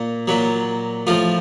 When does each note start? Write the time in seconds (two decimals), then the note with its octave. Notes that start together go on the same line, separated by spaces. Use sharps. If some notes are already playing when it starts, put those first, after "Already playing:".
Already playing: A#2 A#3
0.28 A#2 F#3
1.07 A2 F3 F4